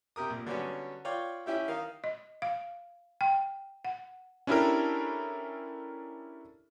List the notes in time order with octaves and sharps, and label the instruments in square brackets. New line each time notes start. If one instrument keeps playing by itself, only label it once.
[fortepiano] C3 G4 A#4 D#6
A#1
D3 F#3 G3 B3 C#4
F4 C#5 D5 G5
C#4 E4 G4 E5
D#3 D#4 F5
[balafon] D#5
F5
G5
F#5
[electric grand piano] C#4 D4 E4 G4 A4 A#4